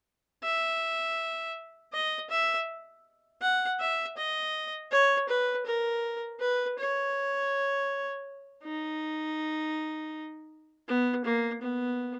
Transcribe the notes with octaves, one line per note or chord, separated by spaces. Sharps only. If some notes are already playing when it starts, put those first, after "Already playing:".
E5
D#5
E5
F#5
E5
D#5
C#5
B4
A#4
B4
C#5
D#4
B3
A#3
B3